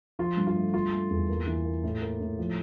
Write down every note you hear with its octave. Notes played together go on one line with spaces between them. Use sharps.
F3 F4
G2
F4
A3
D3 F4
A3
E2
A#3
E3
A#3
A2
A#3
A2
F3